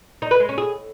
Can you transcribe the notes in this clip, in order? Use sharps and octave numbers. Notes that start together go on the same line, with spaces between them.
D#4
B4
G#3
C#4
G#4